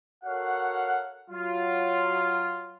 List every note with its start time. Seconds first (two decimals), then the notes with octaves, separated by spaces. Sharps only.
0.24 F#4 A4 A#4 C#5 F5 F#5
1.30 F#3 F4